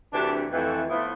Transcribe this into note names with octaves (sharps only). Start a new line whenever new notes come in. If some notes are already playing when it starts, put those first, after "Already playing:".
D2 C3 E3 D4
F2 E3 A3
A2 F3 B3 E4